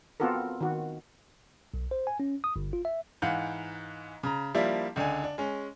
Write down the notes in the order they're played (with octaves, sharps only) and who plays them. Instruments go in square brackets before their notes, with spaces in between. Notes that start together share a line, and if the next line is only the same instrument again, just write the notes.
[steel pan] B3 C4 F4 F#4 A4 A#4
D#3 F#4
[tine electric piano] B1
C5
G#5
C#4
D#6
G1
F4
E5
[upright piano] G#2 E3 F5 F#5 G6
C#3 A#5
F3 G3 A#3 D4 E4 E5
C#2 D3 D4 G#5
D4
G#3 C#4